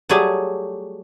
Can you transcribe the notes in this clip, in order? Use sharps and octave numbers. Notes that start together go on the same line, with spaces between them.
F#3 G3 A3 G#4